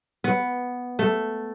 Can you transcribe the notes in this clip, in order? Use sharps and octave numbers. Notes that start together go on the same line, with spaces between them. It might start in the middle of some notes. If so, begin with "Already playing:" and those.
B3
A3